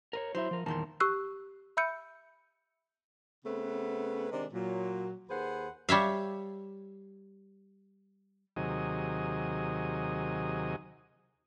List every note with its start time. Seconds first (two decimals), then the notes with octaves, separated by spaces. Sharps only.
0.13 A#4 B4 C#5
0.35 F#3 E4 C5 E5
0.51 F3 A#4
0.66 E2 A#2 D#3 A#4 A5 C6
1.00 G4 C#6 E6 F#6 C7
1.77 E5 B5 E6 G6 C#7 D#7
3.45 C#3 A3 B3 C4 B4
4.32 C3 D#3 G#3 C4 D4
4.52 A#2 F#3
5.30 D#2 G#4 B4 C5 F#5
5.89 G3 C#5 E5 F5
8.56 D#2 C3 F#3 G#4 D#5